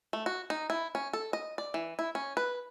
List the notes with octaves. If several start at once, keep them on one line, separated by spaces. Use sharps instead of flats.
A3
F#4
D#4
E4
C#4
A4
D#5
D5
E3
E4
C#4
B4